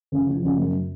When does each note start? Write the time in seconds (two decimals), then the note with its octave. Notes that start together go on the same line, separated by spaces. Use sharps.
0.12 C#3
0.27 F3
0.43 C#3
0.58 F#2